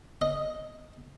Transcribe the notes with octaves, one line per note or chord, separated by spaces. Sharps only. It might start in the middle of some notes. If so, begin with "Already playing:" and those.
D#5